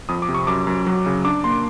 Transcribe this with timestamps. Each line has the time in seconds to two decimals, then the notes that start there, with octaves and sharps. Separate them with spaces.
0.09 F2 D#6
0.22 D6
0.29 C3
0.35 C#6
0.47 F#2 D6
0.67 F#2
0.87 F#3
1.06 C#3
1.25 D4 D6
1.44 A#3 C6